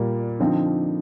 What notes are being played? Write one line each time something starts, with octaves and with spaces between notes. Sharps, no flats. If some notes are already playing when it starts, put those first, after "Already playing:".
Already playing: A#2 G3 A#3
D3 F3 C4 D#4